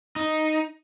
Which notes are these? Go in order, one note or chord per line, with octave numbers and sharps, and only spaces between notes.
D#4